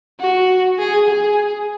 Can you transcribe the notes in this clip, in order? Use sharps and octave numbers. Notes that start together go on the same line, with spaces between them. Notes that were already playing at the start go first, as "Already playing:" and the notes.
F#4
G#4
G#4